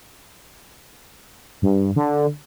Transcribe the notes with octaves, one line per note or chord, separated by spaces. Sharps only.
G2
D3